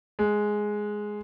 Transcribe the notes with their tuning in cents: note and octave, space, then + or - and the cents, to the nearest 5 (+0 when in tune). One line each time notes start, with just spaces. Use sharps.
G#3 +5